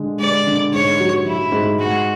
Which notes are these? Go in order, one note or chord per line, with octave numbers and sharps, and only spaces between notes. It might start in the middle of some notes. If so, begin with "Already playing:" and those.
Already playing: D3 G#3
G#3 D5
D3
G#2 C#5
F#3
F#3 E4
G#2
G#3 F#4